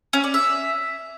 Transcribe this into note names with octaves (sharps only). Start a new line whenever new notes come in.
C#4
D5
E5